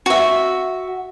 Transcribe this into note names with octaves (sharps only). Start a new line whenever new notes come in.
F#4 E5